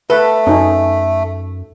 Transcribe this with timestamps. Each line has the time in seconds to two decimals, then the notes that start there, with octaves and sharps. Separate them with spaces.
0.10 A3 A4 B4
0.47 F#2 C#4 D#4